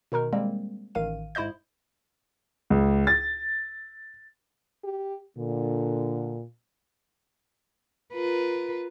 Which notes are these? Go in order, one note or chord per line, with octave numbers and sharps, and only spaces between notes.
B2 D#3 D#4 A#4
G3 G#3 A#3 C4
A1 D#3 F5 D#7
G#2 E4 C5 D#5 G6
C#2
A6
G4
A#2 D3
F4 A#4 B4